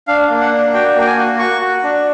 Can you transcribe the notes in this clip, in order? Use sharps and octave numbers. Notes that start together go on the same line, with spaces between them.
D4 F5
A#3
F#5
D4
F#4 G5
A#3 G5
G#5
F#4
F#4 C#6
F#4
D4